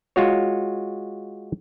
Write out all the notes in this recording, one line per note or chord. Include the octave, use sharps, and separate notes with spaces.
G#3 F4 F#4 C#5